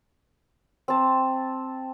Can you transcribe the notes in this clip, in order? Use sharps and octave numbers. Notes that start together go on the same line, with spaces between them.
C4 A5